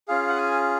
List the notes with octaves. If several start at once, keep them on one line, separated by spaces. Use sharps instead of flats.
C#4 F4 G#4 F5
F#5
G#5